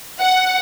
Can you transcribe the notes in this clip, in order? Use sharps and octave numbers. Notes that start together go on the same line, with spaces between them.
F#5